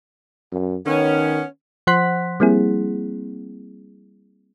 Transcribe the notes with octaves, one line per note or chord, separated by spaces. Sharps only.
F#2
D#3 B3 C#4
F3 C5 F#5 C6 F#6 B6
G3 A#3 C4 E4 G#4